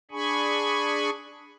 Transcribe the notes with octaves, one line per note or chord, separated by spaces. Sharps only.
D4 G#4 G#5 B5 C#6